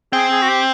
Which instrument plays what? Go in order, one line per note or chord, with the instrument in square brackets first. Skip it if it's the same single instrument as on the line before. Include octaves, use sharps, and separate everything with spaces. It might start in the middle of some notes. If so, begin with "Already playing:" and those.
[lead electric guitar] C4 [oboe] G#4
[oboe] G#4
F#4
G4